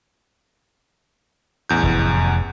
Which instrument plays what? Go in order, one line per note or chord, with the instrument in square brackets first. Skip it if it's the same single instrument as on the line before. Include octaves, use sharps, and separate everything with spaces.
[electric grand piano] A1 E2 G6
[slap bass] F1